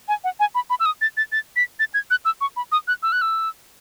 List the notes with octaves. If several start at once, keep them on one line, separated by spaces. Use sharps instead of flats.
G#5
F#5
G#5
B5
B5
E6
D#6
A6
A6
A6
B6
A6
G#6
F#6
E6
C#6
B5
D#6
F#6
E6
F#6
E6